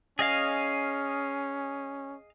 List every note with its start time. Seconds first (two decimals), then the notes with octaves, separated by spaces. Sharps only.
0.19 C#4 G#4 D#5 F5